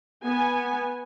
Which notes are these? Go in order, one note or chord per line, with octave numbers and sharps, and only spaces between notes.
B3 G#5